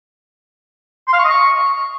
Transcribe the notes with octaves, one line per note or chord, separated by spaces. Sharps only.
C6
F5
C#6
D#5
C#6